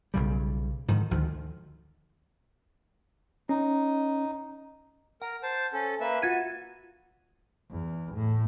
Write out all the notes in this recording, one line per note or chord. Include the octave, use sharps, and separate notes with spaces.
B1 C#3 G3
G#2 D3 D#3 F3
D2 D#3 F3
C#4 D#4
A#4 F#5
C5 A5
C#4 A4
A#3 B4 E5
F4 F#4 G#6 D#7
E2
A2